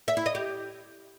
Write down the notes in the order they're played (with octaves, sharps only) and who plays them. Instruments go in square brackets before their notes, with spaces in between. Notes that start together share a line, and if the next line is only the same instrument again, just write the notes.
[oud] E5
E4
D#5
G4